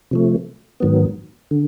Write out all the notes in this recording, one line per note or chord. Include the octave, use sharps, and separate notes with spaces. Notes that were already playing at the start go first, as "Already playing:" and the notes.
C3 F3 A3
G#2 D#3 F#3 B3
D3